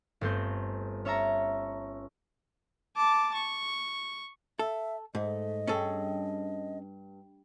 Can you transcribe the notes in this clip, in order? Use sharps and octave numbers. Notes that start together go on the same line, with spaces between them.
G1 A3 C4 G6
C#4 C#5 E5 A5 A#5
A5 D6
C#6
A4 E5
G#2 A3 D#5
G2 C#4 G#4 A4